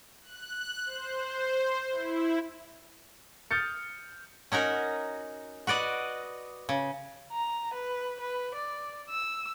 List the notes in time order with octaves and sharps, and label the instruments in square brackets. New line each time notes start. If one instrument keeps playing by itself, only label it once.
[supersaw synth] F#6
C5
E4
[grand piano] D#6 F6 G6 A6 C#7
[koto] C#4 D#4 F#4 A#4
F#4 B4 D5 D#5
C#3
[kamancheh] A#5
B4
B4
D5
E6